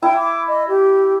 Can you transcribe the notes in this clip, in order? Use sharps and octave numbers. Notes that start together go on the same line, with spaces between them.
E4 G5
D6
D#5
G4